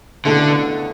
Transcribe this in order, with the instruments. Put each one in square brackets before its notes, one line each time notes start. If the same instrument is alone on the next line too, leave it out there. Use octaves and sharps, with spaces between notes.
[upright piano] C#2 B2 A3 E4 A4 [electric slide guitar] D3